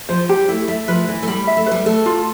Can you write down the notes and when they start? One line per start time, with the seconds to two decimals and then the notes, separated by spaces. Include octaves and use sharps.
0.09 F3 C5
0.29 G3 G4
0.48 A3 E4
0.68 A3 E5
0.88 F3 B4
1.08 E3 B4
1.23 A3
1.27 G3 B5
1.47 E5
1.57 A3
1.66 G3 B4
1.86 A3 A4
2.06 F4